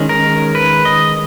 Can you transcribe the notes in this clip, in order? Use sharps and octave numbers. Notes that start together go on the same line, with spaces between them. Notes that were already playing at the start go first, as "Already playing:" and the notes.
Already playing: D#3 G#3 C#4
A#4
B4
D#5